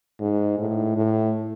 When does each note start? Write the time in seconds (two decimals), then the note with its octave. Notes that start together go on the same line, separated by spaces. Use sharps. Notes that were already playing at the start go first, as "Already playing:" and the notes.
0.20 G#2
0.58 A2
0.96 A2